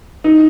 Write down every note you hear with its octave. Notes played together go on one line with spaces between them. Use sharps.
D#4